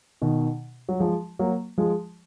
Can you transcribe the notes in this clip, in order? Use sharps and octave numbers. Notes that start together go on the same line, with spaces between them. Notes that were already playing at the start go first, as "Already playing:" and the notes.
B2 D#3
F#3
F3 G#3
F#3 A#3
F3 G#3